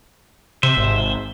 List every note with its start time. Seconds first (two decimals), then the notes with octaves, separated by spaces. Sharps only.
0.63 C3 C5 E5
0.77 G#1